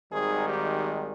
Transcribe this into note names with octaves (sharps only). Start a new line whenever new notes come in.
G#1 G#2 D#3 G3 G#4
G4